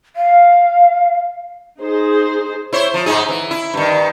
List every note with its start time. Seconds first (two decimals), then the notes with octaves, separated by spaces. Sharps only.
0.16 F5
1.79 D#4 G#4 C5
2.73 E4 C5 C#5
2.94 F3
3.06 G#2 D#4 G#4
3.29 E3
3.51 E4
3.74 G2 D#3